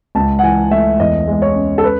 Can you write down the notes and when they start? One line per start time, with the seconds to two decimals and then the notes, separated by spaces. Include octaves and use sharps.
0.15 C#2 A5
0.39 F#5
0.43 E3 G#5
0.71 A3 E5
1.00 E2 D#5
1.27 G#3
1.33 D#5
1.42 C#5
1.56 C#4
1.78 A4
1.84 B4